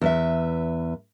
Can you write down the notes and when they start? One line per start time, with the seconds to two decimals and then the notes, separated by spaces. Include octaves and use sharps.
0.01 E2 B4 E5